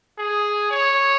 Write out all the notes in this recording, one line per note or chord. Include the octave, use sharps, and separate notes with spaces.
G#4
C#5